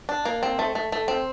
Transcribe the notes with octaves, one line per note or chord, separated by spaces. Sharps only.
D4
A#3
C4
A3
A3
A3
C4